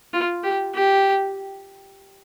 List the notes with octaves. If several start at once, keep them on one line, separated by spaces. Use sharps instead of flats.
F4
G4
G4